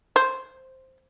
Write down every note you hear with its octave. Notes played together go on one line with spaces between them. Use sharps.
C5